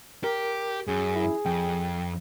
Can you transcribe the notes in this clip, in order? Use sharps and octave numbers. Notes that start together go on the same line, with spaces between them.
G4 A#4
F#2 G#4
E4
F2 G5